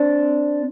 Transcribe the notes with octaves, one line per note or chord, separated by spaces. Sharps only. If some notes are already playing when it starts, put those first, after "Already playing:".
Already playing: C4 D4